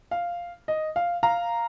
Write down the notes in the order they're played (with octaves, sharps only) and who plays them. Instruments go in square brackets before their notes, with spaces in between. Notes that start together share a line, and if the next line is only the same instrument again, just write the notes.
[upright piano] F5
D#5
F5
F5 A#5